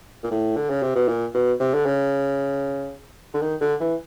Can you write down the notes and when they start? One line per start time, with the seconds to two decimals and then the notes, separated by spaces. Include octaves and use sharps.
0.23 A#2
0.31 A2
0.57 D3
0.70 C#3
0.83 C3
0.95 B2
1.08 A#2
1.34 B2
1.60 C3
1.74 D3
1.86 C#3
3.34 D3
3.42 D#3
3.61 D3
3.81 E3